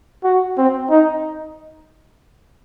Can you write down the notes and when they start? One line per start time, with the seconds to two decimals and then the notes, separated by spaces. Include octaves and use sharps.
0.24 F#4
0.58 C4
0.90 D#4